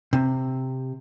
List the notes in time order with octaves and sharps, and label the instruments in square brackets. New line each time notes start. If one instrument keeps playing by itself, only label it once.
[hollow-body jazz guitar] C3